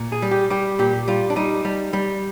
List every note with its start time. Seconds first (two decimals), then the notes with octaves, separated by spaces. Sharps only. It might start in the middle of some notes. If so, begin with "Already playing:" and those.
Already playing: A#2
0.12 G#4
0.22 G3
0.31 G4
0.50 G3 G4
0.79 A#2 G4
1.08 G3 F4
1.30 D4
1.36 G3 D#4
1.65 G3
1.93 G3